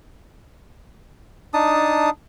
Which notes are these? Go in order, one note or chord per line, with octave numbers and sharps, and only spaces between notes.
D4 D#4 A5 D#6